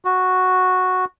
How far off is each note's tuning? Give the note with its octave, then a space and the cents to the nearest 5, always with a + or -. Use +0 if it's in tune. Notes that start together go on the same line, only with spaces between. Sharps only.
F#4 -5